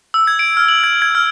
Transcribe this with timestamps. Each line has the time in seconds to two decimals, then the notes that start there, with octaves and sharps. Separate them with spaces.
0.14 E6
0.27 G#6
0.39 D7
0.57 F6
0.68 F#7
0.84 G#6
1.02 G#6
1.15 F6